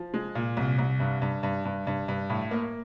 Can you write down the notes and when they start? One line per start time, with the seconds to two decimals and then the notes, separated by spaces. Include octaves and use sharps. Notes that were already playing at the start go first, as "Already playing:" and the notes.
Already playing: F3
0.14 G#3
0.35 A#2
0.57 C2
0.78 C2
1.00 G2
1.22 G2
1.43 G2
1.65 G2
1.87 G2
2.08 G2
2.30 A2
2.51 A#3